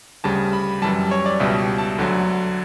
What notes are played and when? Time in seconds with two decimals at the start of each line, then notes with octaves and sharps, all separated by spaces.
0.24 D2 C#3 G3 A5
0.53 B5
0.82 F#2 E3 G3 A5
1.11 C#5
1.26 D5
1.40 C#2 B2 G3 E5
1.78 A5
1.98 D2 D3 F#3